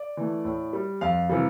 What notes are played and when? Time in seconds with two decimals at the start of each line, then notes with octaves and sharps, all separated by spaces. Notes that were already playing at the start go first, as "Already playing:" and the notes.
Already playing: D5
0.17 E3 A3
0.45 A2
0.73 G3
1.01 F2 F5
1.29 C3 E3 G3